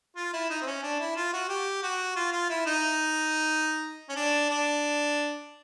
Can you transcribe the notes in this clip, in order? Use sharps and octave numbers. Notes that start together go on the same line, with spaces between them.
F4
E4
D#4
C4
C#4
D4
E4
F4
F#4
G4
F#4
F4
F4
E4
D#4
C#4
D4
D4